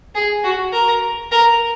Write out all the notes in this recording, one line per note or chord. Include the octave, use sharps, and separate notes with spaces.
G#4
F#4
A#4
A#4